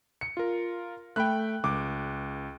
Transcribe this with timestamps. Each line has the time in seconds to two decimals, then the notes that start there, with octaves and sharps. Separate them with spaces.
0.21 C#7
0.37 F4 A#4
1.16 A3 G5 B5 F#6
1.64 C#2 D6